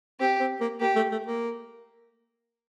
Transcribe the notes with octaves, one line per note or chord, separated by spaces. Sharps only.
C4 G4
C4
A#3
A#3 G4
A3
A3
A#3